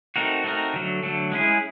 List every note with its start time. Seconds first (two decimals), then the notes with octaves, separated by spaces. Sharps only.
0.16 A3 C4 D#4 F#4 A#4
0.44 A3 C4 D#4 F#4 A#4
0.74 D3 F#3 A3
1.03 D3 F#3 A3
1.32 G#3 C#4 E4 G#4